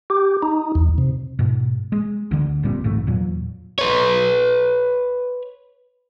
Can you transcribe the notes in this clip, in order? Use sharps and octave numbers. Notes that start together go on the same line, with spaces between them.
G4
D#4
E2
C3
G#2 B2
G#3
D2 D3
F1 A#2 G3 C4
A1 D2 G#2 A3
E2 A#2 F#3
B4 C#5